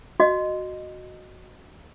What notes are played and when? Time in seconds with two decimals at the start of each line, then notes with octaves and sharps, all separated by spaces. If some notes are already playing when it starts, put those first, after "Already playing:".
0.20 F#4 D#5